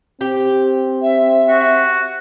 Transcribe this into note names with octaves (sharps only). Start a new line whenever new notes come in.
C4 G4
E5
F#4